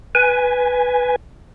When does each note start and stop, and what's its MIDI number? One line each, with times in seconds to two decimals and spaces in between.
0.15 1.16 71
0.15 1.16 80